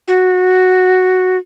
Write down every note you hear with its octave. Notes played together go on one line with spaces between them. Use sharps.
F#4